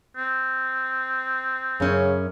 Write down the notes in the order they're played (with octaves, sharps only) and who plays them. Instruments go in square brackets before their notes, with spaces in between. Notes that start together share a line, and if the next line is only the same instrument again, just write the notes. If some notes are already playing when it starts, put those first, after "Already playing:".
[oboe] C4
[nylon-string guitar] F#2 C#4 [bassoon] C#3